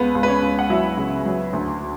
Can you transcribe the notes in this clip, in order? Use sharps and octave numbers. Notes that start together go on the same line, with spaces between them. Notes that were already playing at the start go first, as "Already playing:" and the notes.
Already playing: C#2 B3 B4
C#2
B4
C#4 C#5
C#2
F#5
F#3 E4 E5
C#3
F#3
D2